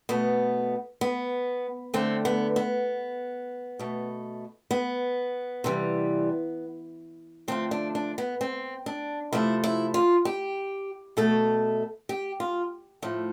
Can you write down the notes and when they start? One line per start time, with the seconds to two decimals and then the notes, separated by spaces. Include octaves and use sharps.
0.09 B2 A3 B3
1.01 B3
1.94 D3 A3 C4
2.25 B3
2.56 B3
3.79 B2 A3
4.71 B3
5.64 C3 E3 G3
7.48 D3 F3 A3 C4
7.71 D4
7.95 D4
8.18 B3
8.41 C4
8.86 D4
9.33 C3 F3 A3 E4
9.64 E4
9.94 F4
10.25 G4
11.17 B2 A3 A4
12.09 G4
12.40 F4
13.02 A2 F3 A3